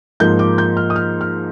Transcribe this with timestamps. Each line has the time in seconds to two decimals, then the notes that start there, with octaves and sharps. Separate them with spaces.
0.20 G#2 F3 A#3 G6
0.39 D6
0.58 G6
0.77 F6
0.90 D#6
0.96 F6
1.21 F6